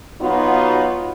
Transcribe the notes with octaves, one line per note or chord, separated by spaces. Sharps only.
F#3 B3 D#4 F4 F#4